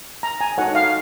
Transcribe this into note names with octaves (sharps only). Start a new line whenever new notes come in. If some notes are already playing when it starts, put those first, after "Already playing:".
A#5
G#5
D#4 F#4 A4 C#5 F#5
F5